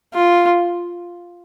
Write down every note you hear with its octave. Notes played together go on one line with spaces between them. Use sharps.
F4